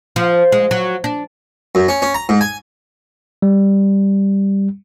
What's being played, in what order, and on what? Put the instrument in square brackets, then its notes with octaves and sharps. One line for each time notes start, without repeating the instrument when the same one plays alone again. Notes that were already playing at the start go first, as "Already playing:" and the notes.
[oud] F3
G#3
F#3
D4
[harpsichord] F#2
C#4
C#4
A#5
G#2
G#5
[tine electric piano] G3